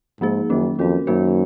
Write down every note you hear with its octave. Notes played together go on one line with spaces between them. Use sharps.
G#2 F3 A#3 D#4 G#4
F#2 D#3 F#3 A#3 C#4
F2 C#4 F#4 A#4
F#2 D#3 A#3 D#4 F#4 C5